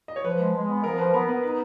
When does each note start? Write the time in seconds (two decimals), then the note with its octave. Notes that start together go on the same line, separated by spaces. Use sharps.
0.08 D#5
0.16 C#5
0.24 F3 B4
0.40 G#3
0.55 G#3
0.69 B3
0.84 F3 A#4
0.98 F3 B4
1.14 B3 A#4
1.28 B3 B4
1.43 D#4 B4